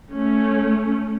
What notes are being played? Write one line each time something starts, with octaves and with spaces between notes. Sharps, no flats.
A3 C#4